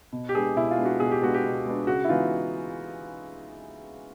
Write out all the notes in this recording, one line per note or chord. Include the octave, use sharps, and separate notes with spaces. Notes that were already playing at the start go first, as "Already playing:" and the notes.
B2
G4
G#3 B3 D4 G#4
B2 E4
F4
G#3 B3 D4
F#4
B2 G#4
G4
G#3 B3 D4 F#4
G4
B2
G#3 B3 D4
C#3 F#4
E4
E3 G#3 B3 D#4 F4